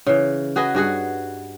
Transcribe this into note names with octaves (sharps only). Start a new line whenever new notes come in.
C#3 E3
F#4 G#4 B4 D#5
G2 F#4 G#4 F#5